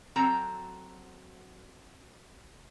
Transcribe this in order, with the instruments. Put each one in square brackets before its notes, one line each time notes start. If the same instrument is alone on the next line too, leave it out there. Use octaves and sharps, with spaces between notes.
[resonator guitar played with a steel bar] F#3 C4 F#4 A4 G5 A#5